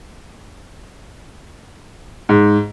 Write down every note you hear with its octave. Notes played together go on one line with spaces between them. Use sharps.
G#2